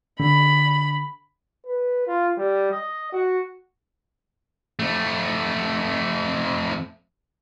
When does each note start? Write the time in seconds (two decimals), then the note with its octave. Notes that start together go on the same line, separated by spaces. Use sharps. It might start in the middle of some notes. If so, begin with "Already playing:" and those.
0.20 D3 B5
1.66 B4
2.07 F4
2.38 G3
2.72 D#5
3.13 F#4
4.79 F2 A3